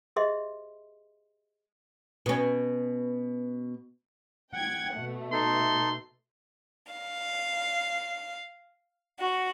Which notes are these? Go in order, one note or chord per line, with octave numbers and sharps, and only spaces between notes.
G4 G#4 C5 D#5 E5 C6
B2 C#4
F#5 G5 G#6
B2 A3
D#4 A4 C6
F5
F#4